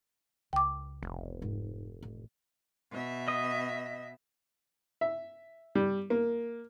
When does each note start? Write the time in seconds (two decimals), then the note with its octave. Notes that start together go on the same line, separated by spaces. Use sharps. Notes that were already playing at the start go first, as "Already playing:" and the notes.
0.53 C#2 G5 D6
1.03 F1 B3
1.42 G#2
2.03 A1
2.92 B2 E5
3.28 D#5 D#6
5.01 E5
5.75 G3
6.10 A#3